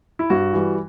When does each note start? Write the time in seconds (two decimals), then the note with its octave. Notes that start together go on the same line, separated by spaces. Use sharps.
0.19 E4
0.30 G2 F#4
0.54 E3 G3